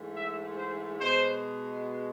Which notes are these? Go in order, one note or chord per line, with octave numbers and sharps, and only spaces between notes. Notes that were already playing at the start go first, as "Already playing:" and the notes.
Already playing: G#2 E3 A3
E5
C5
B2 G#3 C5